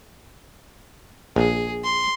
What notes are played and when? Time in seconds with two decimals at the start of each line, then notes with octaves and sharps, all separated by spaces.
1.36 A#1 G#4
1.84 C6